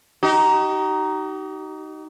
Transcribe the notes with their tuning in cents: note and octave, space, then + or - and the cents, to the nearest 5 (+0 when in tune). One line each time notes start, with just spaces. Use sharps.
D#4 +0 G4 -45